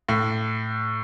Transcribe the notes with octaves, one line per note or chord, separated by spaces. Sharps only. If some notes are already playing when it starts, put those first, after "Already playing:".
A2